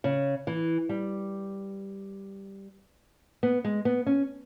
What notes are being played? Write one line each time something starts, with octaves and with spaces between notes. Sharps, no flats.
C#3
E3
G3
B3
G#3
B3
C#4